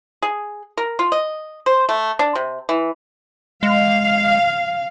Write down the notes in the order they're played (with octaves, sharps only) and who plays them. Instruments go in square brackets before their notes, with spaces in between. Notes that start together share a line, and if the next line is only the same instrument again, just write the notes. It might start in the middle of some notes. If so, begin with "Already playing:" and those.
[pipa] G#4
A#4
F4
D#5
C5
A3
D4
C3
E3
[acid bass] G#3 [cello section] F5